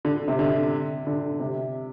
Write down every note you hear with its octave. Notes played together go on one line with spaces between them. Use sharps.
D3
C3
D3
D3
C3